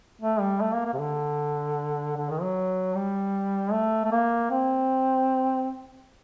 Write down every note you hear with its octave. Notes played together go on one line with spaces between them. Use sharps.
A3
G3
A3
A#3
A#3
C3
D3
D3
D#3
F#3
G3
A3
A3
A#3
C4